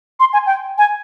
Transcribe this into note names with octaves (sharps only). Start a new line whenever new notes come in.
C6
G#5
G5
G#5